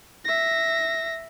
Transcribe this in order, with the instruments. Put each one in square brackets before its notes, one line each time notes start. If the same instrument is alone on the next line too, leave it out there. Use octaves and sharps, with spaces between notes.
[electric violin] E5 A#6